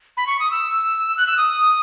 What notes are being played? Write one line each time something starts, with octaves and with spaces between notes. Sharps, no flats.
B5
C#6
D#6
E6
F#6
E6
D#6